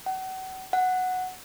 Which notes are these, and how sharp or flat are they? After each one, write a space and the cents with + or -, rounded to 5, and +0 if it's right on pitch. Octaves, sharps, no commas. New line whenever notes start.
F#5 +35
F#5 -5